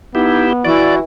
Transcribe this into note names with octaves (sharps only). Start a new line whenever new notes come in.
B3 D#4 E4 G4
E3 E4 F#4 D5